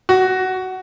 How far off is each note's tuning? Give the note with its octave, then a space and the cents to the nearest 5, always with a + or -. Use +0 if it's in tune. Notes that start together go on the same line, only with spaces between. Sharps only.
F#4 +15